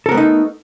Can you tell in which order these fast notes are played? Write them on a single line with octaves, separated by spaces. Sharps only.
A4 A#4 B3 A3 D#4